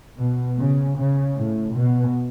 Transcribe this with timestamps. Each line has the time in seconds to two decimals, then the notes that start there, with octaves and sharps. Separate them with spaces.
0.19 B2
0.59 C#3
0.97 C#3
1.37 A2
1.76 B2